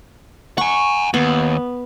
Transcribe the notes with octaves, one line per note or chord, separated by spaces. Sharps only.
F#5 G#5 C#6
D#2 B3